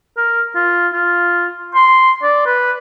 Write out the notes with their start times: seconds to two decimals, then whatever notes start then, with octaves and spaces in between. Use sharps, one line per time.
0.17 A#4
0.56 F4
0.93 F4
1.75 C6
2.23 D5
2.46 B4